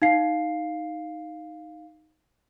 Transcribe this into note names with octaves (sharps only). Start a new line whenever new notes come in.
D#4 F5 C7